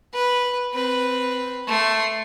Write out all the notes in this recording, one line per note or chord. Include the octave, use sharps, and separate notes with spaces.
B4
C4 B4
A3 C6